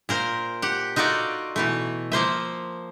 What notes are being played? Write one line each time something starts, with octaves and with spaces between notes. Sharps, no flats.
A#2 A#4 C5
G4 F#5
D#4 F4 F#4 A4 D5
B2 E3 A3
F3 A#3 C5 E5